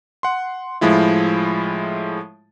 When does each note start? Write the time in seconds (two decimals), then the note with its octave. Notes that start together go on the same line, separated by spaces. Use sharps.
0.23 F#5 C6
0.81 A2 F3 G#3 E4 F4